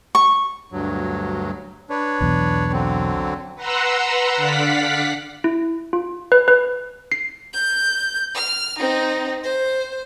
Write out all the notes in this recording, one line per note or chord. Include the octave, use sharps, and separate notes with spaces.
C#6
D2 G2 F#3
D4 B4 C#5
B1 E2
D3 F#3 C4
B4 F#5 A#5 C6 E6
D3 D5 F5 F#5 B6
E4
F4
B4
B4
C7
G6
F6
C4 D#4
C5